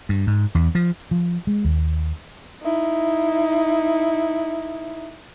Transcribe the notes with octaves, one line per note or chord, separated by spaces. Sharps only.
G2
G#2
E2
F3
F3
G#3
D#2
D#4 E4